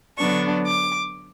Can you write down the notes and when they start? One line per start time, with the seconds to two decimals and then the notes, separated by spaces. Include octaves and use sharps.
0.18 D3 F#3 B3 D4 C#6
0.66 D6